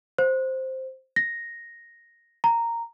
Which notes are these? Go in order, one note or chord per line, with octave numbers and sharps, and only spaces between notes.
C5
A#6
A#5